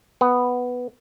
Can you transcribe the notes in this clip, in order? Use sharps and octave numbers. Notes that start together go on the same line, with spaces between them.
B3